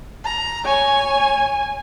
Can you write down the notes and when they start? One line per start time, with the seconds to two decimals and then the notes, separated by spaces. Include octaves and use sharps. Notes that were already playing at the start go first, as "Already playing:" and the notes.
0.24 A#5
0.66 C#5 G#5